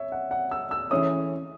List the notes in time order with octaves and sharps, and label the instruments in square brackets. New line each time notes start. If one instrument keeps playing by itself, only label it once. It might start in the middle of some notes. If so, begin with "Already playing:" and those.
Already playing: [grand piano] C#5 E5
F#5
F#5
E6
E6
[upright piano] E3 A3 C#4 G#4 C#5 [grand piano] D#6